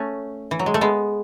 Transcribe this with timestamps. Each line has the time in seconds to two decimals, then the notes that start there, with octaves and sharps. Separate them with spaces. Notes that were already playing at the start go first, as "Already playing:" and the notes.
Already playing: A3 C#4
0.51 E3
0.59 F#3
0.66 G#3
0.74 A3
0.81 G#3 B3